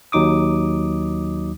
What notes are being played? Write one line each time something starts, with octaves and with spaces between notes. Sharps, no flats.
D#2 F#3 D#4 D6 D#6